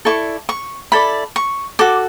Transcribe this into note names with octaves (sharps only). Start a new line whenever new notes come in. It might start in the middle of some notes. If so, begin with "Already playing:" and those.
E4 A4 D5 C#6
C#6
E4 A4 D5 B5
C#6
F#4 A4 D6